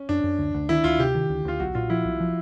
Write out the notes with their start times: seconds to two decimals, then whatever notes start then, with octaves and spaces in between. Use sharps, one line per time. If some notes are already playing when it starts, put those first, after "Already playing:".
Already playing: C#4
0.09 F#2 D4
0.24 F#2
0.38 D2
0.54 D2
0.69 D#3 E4
0.84 D2 F4
0.99 C3 G4
1.15 D#3
1.30 D2
1.45 D2 F4
1.60 B1 F#4
1.75 A#2 F4
1.90 F3 E4
2.05 B1
2.20 F3